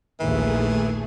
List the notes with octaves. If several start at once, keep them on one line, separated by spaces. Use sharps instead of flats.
A#1 D#2 E3 A3 G#4